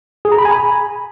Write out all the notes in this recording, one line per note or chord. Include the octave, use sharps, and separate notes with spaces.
G#4
A#5
B5
G#5
B5